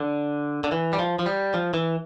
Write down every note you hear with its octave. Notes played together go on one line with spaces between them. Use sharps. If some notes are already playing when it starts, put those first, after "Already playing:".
Already playing: D3
D3
E3
G3
F3
F3
G3
F3
E3